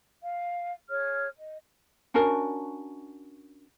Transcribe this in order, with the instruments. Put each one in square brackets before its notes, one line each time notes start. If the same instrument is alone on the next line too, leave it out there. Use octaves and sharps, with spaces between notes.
[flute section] F5
G#4 C#5 F6
D#5
[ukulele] C#4 D4 F#4 A#4